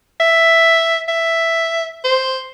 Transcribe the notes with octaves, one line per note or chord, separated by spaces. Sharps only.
E5
E5
C5